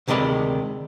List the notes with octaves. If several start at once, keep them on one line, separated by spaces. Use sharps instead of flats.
D2 C3 D#3 G#3 D5 B5